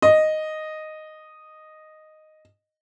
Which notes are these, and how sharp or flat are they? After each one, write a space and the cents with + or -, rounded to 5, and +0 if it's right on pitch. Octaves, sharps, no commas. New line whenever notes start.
D#5 -5